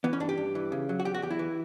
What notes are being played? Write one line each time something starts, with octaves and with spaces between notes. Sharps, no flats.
E3 B3
C#4
G2 D4
G4
G2
E3
C#3
F#3
F#4
E2 G4
F#4
E2 G4
E4
E3